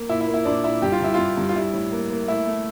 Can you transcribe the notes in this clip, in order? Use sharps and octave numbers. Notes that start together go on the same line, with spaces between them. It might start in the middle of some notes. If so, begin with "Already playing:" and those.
Already playing: A#3
A#2 E4
E4
A#3
E4
A#2 D4
A#2 E4
G2 G4
F4
G2 E4
G2 F4
G2
F4
G3 E4
A2
A#3
A#3
A3 E4
A3